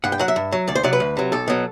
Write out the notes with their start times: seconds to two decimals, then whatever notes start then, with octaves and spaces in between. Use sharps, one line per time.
0.04 G2 F#5
0.12 G5
0.19 F#3 F#5
0.28 E5
0.36 G2
0.52 F#3
0.68 D2 D5
0.75 C5
0.83 C3 F#3 D5
0.93 B4
1.00 D2
1.17 C3 F#3
1.32 B1 A4
1.48 B2 F#3